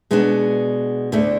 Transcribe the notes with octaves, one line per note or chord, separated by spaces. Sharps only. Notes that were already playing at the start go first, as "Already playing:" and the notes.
B2 G#3 B3 D4
D2 D3 A3